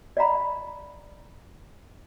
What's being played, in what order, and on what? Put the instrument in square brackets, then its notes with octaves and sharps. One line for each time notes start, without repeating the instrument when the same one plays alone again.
[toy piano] D5 D#5 F5 F#5 A#5 B5